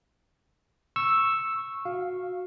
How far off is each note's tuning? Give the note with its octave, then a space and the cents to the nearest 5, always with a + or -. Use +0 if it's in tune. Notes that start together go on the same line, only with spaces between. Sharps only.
C#6 -10 E6 +0
F#4 -20 F5 +0